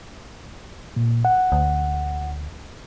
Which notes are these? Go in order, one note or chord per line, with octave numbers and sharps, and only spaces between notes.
A#2
F#5
D2